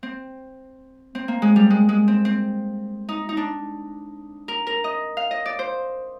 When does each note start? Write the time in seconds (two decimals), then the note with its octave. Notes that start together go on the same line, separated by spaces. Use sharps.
0.03 C4
1.15 C4
1.28 A#3
1.42 G#3
1.56 G3
1.70 G#3
1.89 G#3
2.08 C4
2.25 C4
3.09 D#4
3.29 D#4
3.37 D4
4.48 A#4
4.67 A#4
4.84 D#5
5.17 F5
5.31 D#5
5.46 D5
5.59 C5